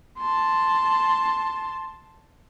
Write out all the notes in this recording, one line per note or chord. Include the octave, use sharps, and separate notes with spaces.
A5 C6